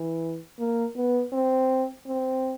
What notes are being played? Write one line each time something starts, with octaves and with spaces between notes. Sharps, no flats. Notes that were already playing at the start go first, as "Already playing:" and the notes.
Already playing: E3
A#3
B3
C4
C4